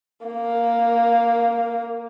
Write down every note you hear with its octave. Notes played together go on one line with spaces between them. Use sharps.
A#3